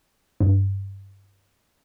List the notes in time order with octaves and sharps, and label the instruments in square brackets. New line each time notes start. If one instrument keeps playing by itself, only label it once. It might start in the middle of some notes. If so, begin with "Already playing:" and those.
[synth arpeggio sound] G2